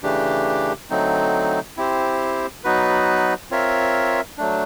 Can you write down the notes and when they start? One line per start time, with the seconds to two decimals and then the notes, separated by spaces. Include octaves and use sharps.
0.03 C#3 E3 A3 D4 G4
0.90 D3 F#3 A3 C4 D#4
1.77 C4 E4 G4 C5
2.64 F#3 B3 D#4 F#4 B4
3.51 C4 F4 A#4 C#5 E5
4.38 F#3 A3 D4